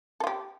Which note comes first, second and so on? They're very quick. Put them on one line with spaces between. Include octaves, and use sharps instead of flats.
A4 F4 G4